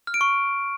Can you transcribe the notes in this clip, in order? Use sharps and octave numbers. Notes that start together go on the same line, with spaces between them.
F6
D7
C#6